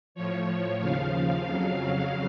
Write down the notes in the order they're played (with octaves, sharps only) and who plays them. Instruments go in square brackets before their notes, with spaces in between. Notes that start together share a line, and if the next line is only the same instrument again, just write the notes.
[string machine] A2 F3 C#5
C#5
D#2 C#3 F3 F5
F2 C#3 F#3 F5
F5